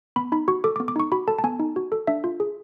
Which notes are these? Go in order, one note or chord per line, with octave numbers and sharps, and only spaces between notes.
B3 B5
D#4 B5
F#4 C#6
A4 D6
D6
B3
D6
D#4 C#6
F#4 B5
A4 A5
A5
B3 G#5
D#4
F#4
A4
D4 E5
F4
G#4